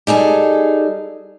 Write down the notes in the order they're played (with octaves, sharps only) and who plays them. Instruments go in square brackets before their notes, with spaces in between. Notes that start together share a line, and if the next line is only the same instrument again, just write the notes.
[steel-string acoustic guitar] G3 D#4 G#4 A4